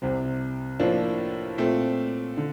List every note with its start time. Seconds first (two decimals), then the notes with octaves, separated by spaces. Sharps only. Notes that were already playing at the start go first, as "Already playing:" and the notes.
0.02 C2 C3 G3 C4
0.80 A2 F3 A#3 D4 F4
1.58 A#2 A3 C4
2.38 D3